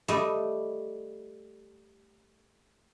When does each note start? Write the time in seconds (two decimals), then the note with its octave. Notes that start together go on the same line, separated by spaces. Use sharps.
0.08 G3 A3 D#5